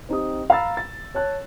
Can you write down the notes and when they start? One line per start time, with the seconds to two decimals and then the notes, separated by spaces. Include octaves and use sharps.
0.09 C4 D#4 G4 D#6
0.50 F5 A#5 B5 E6 A6
0.77 A6
1.15 C#5 A5 F#6